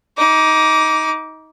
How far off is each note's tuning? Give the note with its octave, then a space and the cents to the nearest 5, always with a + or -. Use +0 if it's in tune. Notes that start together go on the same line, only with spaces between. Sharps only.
D#4 +20 D6 -10